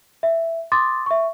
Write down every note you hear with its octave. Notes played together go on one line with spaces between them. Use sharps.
E5
C6 D6 D#6 A6
E5 C#6